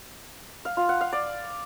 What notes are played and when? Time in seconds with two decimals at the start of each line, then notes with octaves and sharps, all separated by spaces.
0.65 F5
0.77 F4
0.89 F#5
1.01 F5
1.13 D5